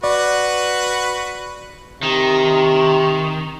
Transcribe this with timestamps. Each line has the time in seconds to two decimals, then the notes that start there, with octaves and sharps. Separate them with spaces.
0.04 F#4 B4 D5
2.03 C3 D#3